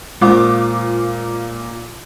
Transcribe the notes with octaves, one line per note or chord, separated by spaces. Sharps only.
A#2 G#3 F4 C5 D6 D#6